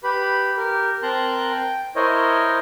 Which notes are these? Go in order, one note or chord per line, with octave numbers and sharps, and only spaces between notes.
G4 B4 B5
G4 A#4
C4 A#4 A5 A#5 C6 F#6
G5
E4 A#4 C5 C#5 D#5